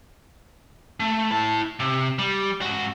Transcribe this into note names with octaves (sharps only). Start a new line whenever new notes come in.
A3
E4 A5
C3
G3
G#2 F#4